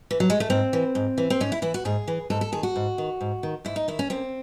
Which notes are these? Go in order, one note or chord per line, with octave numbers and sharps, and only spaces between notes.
E3
F#3
G#3
A3
G#2 C4
E3
G#2
E3
C4
G#2 C#4
E4
E3 E4
F#4
G#2 G#4
E3
G#2 A4
A4
D#3 G#4
F#4
G#2
D#3
G#2
D#3
G#2 E4
D#4
D#3 E4
C#4
F#2 C4